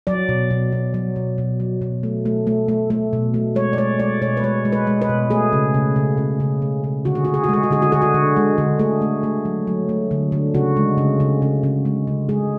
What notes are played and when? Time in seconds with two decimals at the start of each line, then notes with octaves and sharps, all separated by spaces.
0.07 F#3 D5
0.29 B2
0.50 B2
0.72 B2
0.94 F#3
1.16 B2
1.38 B2
1.60 F#3
1.82 B2
2.03 A3
2.25 A3
2.47 A3
2.68 A3
2.90 A3
3.13 B2
3.34 A3
3.55 G#3 C#5
3.73 D5
3.77 G#3 C#5
3.99 G#3 D5
4.22 B2 C#5
4.37 B4
4.43 G#3 C#5
4.65 G#3
4.72 B4
4.87 G#3
5.01 B4
5.09 B2
5.30 A3 G#4
5.53 C#3
5.74 C#3
5.96 C#3
6.18 C#3
6.40 C#3
6.62 A3
6.84 C#3
7.05 D3 F#4
7.15 G#4
7.25 D3 F#4
7.34 G#4
7.44 F#4
7.49 G#3 G#4
7.63 F#4
7.71 D3 G#4
7.82 F#4
7.92 D3 G#4
8.02 F#4
8.14 D3
8.36 G#3
8.58 D3
8.79 A3 G#4
9.02 A3
9.23 A3
9.45 F#3
9.67 F#3
9.89 A3
10.11 D3
10.32 D3
10.54 C#3 F#4
10.76 G#3
10.98 C#3
11.20 C#3
11.42 C#3
11.63 C#3
11.85 G#3
12.07 C#3
12.29 G#3 G#4